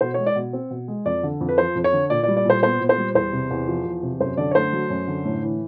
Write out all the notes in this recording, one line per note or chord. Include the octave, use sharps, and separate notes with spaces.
B2 C5
G#3 C#5
D5
B2
C4
B2
G#3
F2 D5
D3
F2
B4
F3 C5
F2
C#5
D3
A#2 D5
D5
G3
D5
A#2 C5
B3 C5
A#2
C5
G3
E2 C5
C3
E2
F3
E2
C3
F#2 C5
D3 D5
C#5
A3 C5
F#3
F#2
D3
A2
E3